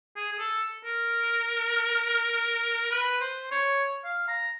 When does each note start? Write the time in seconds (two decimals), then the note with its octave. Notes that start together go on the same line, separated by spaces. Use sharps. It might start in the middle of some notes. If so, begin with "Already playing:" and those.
0.16 G#4
0.32 G#4
0.39 A4
0.85 A#4
2.91 B4
3.21 C5
3.51 C#5
4.05 F5
4.28 A#5